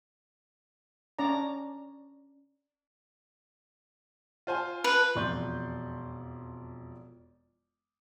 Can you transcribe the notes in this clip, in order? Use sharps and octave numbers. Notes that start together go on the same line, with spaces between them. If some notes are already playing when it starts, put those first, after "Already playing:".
C#4 D4 D5 A#5
F4 C5 G#5
B4
E1 F2 D5 C6 C#6 G6